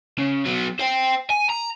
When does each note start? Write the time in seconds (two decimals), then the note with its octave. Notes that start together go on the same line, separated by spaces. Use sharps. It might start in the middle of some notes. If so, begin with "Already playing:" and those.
0.19 C#3
0.45 F#3 B3
0.80 C5 G5
1.30 G#5
1.49 A#5